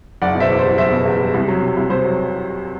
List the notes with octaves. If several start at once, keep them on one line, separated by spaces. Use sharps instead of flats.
F#1 D5 F#5
B2
C5 E5
E2
C5
G3
F#1 C5 E5
B2
E2
G3
C2
F#3
C3
C2
C2 C5
F#3